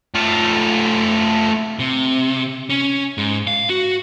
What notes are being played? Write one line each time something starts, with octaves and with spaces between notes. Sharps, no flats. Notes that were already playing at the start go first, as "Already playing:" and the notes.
A3 F4
C3
C#4
G#2
F5
F#4